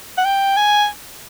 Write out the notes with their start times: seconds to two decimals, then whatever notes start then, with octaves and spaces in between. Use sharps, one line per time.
0.18 F#5
0.25 G5
0.57 G#5